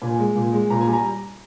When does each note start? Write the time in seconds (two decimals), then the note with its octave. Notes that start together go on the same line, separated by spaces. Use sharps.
0.02 A#2 G#5
0.19 G#3
0.35 A#2
0.52 G#3
0.70 A#2 A#5
0.81 G#5
0.87 G3
0.93 A#5